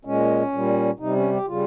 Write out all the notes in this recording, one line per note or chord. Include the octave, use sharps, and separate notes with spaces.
A#2 G#3 C#4
A#2 G3
C3 G3 D#4
C#4
G4
C#3 G3 F4